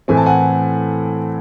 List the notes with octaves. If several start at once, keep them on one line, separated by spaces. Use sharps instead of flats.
A2 E3 A3 C4 G#5
A5
F#5 G#5